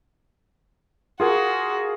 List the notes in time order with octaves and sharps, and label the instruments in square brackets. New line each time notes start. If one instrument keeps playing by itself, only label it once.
[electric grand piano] F4 G#4 A#4 [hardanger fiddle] F#4